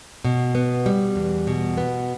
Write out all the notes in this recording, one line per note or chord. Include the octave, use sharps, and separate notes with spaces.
B2
B3
G3
E2
B2
B3